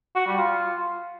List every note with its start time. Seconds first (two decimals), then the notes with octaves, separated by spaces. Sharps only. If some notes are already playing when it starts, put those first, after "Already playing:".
0.15 F#4
0.26 G3
0.38 F4